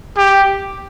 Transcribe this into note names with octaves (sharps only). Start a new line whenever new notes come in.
G4